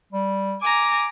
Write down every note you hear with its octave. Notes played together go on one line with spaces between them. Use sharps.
G3
G#5 A#5 D6